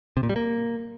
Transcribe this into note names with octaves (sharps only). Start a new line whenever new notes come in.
C3
A#2
G3
A#3